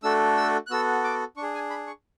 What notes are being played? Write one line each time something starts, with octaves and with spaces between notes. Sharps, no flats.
A3 D4 F#4 A4 E6
E6
F#6
B3 F#4 A4 E6
D6
D4 C#6
G#4
G#5
B5
C#6